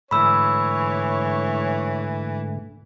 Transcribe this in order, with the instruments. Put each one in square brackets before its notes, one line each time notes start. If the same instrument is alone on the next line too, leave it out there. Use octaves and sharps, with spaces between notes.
[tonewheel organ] G#2 D3 A3 [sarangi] E3 [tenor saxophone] C#5 [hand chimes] B5 E6